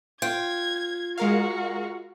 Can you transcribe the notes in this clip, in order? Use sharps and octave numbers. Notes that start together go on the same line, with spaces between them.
F4 G5 G#6
G#3 F#4 A#4 F5